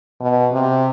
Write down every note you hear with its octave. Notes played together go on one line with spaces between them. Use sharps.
B2
C3